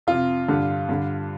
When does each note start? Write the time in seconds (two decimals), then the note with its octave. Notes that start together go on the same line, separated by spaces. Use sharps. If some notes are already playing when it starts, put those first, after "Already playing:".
0.07 F2 C3 F4
0.48 G2 D3
0.89 G2 D3